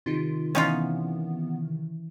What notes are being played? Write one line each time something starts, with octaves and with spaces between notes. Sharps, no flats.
C3 D#3 F4
E3 B3 C#4 D#4 F4